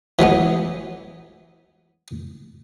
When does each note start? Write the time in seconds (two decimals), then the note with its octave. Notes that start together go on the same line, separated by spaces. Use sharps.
0.19 E3 F#3 G#3 B3